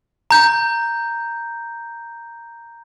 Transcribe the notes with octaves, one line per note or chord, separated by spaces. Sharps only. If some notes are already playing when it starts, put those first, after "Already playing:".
A#5 G6